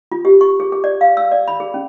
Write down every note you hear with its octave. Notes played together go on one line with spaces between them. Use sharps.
F4
G4
C#6
G#4
G#4
D5
F5
E6
D5
B5
G#4
C#4